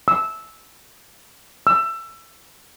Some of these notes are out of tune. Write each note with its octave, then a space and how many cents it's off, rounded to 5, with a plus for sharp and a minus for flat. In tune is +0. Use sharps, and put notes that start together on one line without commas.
E6 -10
E6 +20